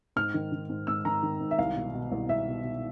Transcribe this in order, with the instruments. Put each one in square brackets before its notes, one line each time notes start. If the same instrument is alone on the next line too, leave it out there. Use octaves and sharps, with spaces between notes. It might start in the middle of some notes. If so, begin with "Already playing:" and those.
[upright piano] G#2 F6
D#3
D#3
G#2
G#2 E6
D#3 A#5
D#3
G#2
E5
C2 F5
B2
B2
C2
C2 E5
B2
B2